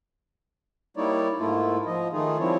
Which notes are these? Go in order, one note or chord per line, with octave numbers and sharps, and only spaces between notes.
G3 A#3 D#4 E4 C#5 D5
G#2 A3 A#3 E4 F4
F3 D#5
D#3 A3 D#4 F4 G#4
F3 G3 C4 E4 C#5